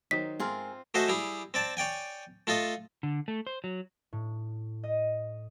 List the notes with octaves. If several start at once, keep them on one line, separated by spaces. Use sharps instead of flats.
D#3 F#3 D#4 C5 B6
G#2 C4 F4 G#4 A#4
A3 F#4 C5 D#5 E5 G#5
G3 E4 G#4
C4 D5 A5
C#5 D5 G5 G#5
A3 F4 A4 D#5
D3
A3
C5
F#3
A2
D#5